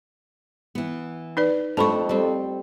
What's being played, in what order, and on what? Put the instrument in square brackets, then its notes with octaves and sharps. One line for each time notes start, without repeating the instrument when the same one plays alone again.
[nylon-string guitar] E3 B3
[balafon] D#4 B4 D5
[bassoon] F2 [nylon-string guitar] A3 D4 [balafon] A5 B5 C#6
[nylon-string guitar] G3 C4